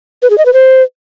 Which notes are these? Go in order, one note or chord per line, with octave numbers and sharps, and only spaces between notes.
B4
G#4
D#5
B4
C5